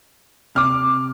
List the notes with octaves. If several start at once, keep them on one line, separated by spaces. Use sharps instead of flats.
C3 D6 F6